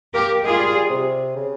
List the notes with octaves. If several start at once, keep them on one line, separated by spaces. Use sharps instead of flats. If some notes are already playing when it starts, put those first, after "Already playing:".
A#3 G4 A#4
G#3 F4 G#4
G3
G3
C3
C#3